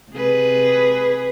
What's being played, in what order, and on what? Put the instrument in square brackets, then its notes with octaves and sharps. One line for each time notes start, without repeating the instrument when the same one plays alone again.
[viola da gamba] C3 G#4 B4